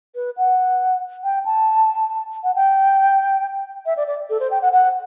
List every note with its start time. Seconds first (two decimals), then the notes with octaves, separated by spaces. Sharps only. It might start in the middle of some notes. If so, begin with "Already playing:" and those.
0.15 B4
0.37 F#5
1.24 G5
1.45 A5
2.44 F#5
2.55 G5
3.86 E5
3.97 D5
4.07 D5
4.30 A4
4.40 C5
4.51 G5
4.62 F#5
4.73 F#5